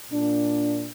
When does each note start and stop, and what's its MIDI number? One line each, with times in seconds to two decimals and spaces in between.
0.12 0.89 46
0.12 0.89 62